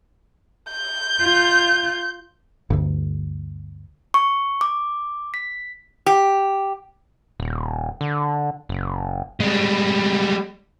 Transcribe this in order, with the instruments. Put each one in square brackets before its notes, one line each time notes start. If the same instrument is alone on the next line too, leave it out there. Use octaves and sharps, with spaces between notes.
[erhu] G6
[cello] F4
[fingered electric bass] G1 D2
[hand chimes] C#6
D6
B6
[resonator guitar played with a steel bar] G4
[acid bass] D#1
D3
F#1
[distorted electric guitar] G3 G#3